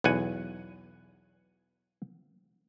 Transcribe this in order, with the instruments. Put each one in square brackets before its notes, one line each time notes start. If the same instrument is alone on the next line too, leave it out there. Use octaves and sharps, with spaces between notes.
[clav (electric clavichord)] B1 E2 F#5 G#5